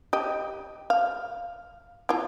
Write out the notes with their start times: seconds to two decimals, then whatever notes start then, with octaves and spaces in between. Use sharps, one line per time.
0.13 G4 D#5
0.90 F5
2.09 E4 F4